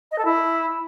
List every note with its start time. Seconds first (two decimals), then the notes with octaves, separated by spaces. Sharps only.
0.11 D#5
0.18 A4
0.25 E4